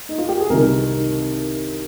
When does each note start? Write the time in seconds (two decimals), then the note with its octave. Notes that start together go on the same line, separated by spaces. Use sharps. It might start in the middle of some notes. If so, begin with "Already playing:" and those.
0.09 D#4
0.18 F4
0.29 G4
0.39 G#4
0.49 C2 C3 D#3 A#4
0.94 D#4